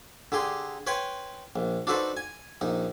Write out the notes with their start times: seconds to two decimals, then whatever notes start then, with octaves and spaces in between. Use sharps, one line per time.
0.32 D3 G4 G#4 C6
0.87 B4 C#5 G5 G#5 C6
1.56 A#1
1.87 D4 D#4 F#4 A4 B4 C5
2.17 G#5
2.61 A#1 D#4